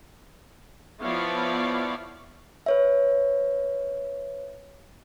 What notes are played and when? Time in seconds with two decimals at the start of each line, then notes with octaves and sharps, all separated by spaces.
1.02 F3 B3 E4 C#5 D5 F5
2.66 B4 C#5 E5